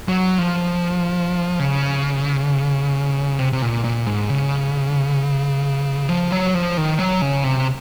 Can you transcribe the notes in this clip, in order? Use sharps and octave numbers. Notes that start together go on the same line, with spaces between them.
F#3
F3
C#3
C3
C3
A#2
A#2
G#2
C#3
F3
F#3
F3
D#3
F#3
C#3
C3